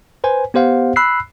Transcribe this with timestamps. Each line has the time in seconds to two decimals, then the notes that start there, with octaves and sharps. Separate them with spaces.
0.24 B4 C5 G#5
0.54 B3 G4 C5 F5 F#5
0.96 B5 E6 F#6 C7